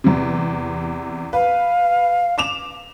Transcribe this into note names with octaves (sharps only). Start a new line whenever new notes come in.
E2 C3
B4 F5
D6 E7 F7